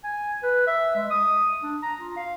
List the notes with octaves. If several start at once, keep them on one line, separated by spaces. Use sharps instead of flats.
G#5
B4
E5
G#3
D#6
D4
A#5
F4
F5